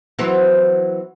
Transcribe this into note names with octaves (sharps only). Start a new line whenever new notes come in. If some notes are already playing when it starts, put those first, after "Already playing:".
E3 F#3 C4